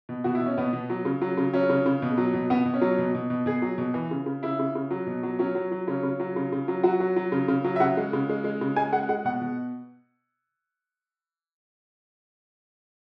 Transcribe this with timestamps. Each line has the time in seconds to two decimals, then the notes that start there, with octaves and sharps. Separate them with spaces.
0.09 B2
0.24 B2 F#4
0.35 E4
0.41 B2
0.46 C#4
0.58 B2 B3
0.73 B2
0.90 F#3
1.05 C#3
1.21 F#3
1.37 C#3
1.54 F#3 C#4
1.69 C#3
1.86 C#3
2.02 B2
2.17 F#3
2.34 B2
2.50 B2 B3
2.66 B2
2.74 C#4
2.81 F#3
2.98 B2
3.15 B2
3.30 B2
3.46 B2 G#4
3.62 F#3
3.78 B2
3.94 E3
4.11 C#3
4.26 C#3
4.43 C#3 E4
4.59 C#3
4.75 C#3
4.91 F#3
5.07 B2
5.23 F#3
5.39 F#3 C#4
5.55 F#3
5.72 F#3
5.87 C#3 C#4
6.03 C#3
6.20 F#3
6.36 C#3
6.52 C#3
6.68 F#3
6.83 F#3 F#4
7.00 F#3
7.16 F#3
7.32 C#3
7.48 C#3
7.64 F#3
7.76 E5
7.80 C#3 F#5
7.97 G#3
8.13 C#3
8.29 G#3
8.44 G#3
8.61 C#3
8.76 G#3 G#5
8.93 G#3 F#5
9.09 G#3 F#5
9.25 B2 F#5
9.41 B2